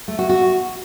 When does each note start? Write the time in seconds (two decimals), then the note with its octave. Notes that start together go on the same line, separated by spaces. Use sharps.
0.08 A3
0.19 F#4
0.29 F#4